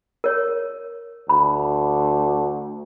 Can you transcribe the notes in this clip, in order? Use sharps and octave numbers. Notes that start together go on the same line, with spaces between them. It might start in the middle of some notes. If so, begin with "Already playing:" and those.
A#4 C#5
D2 B5